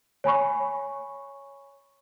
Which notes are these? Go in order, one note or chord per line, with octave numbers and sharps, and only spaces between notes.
C#5 G#5 B5 C#6